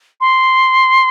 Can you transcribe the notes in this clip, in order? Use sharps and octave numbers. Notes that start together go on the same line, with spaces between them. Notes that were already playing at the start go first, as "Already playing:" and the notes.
C6